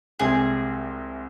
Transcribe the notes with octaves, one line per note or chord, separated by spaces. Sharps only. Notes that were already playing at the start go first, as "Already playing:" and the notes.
C2 C3 G#3 C4 G#4